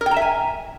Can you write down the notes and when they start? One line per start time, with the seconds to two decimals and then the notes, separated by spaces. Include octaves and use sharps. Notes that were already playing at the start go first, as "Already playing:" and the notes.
0.01 A#4
0.06 G5
0.11 A#5
0.16 E5
0.22 G#5